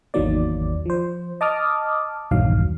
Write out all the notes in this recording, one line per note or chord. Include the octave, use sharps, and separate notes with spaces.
G#1 E2 D#3 F#3 A#3 D5
F3 C5
D#5 A5 D6 D#6 F6
A#1 E2 G2 D#3 F#3 F5